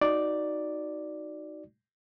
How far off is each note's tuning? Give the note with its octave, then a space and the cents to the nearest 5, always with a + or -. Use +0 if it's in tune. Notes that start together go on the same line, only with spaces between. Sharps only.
D#4 +0 F#4 +0 D5 +0